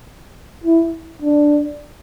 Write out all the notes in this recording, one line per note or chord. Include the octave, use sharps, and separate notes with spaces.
E4
D4